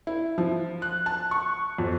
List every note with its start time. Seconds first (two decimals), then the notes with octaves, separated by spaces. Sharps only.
0.07 E4
0.38 F3
0.82 F#6
1.06 A5
1.31 C#6
1.78 F2